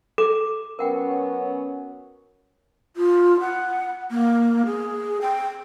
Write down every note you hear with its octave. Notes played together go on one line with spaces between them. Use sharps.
A4 D6
F#3 B3 C#4 A#4 F#5 G5
F4
F#5
A#3
G#4
G5